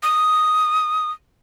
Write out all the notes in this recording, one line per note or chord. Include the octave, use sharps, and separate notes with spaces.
D#6